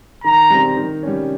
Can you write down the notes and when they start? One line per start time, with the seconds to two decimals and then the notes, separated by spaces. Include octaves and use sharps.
0.24 D#3 A#5
0.50 G3 C4
0.77 D#3
1.03 G3 C#4